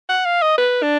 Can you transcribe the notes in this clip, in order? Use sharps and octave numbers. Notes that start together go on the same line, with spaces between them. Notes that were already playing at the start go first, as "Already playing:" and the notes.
F#5
F5
D#5
B4
D4